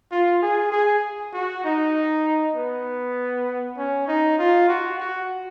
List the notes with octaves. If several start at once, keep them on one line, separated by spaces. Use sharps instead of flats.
F4
G#4
G#4
F#4
D#4
B3
C#4
D#4
F4
F#4
F#4